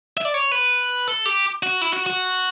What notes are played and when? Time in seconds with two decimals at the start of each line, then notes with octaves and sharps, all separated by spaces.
0.17 E5
0.25 D5
0.34 C#5
0.52 B4
1.08 A4
1.26 G4
1.63 F#4
1.82 E4
1.93 F#4
2.06 F#4